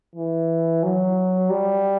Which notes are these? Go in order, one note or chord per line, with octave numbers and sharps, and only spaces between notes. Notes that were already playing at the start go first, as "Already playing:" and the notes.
E3
F#3
G3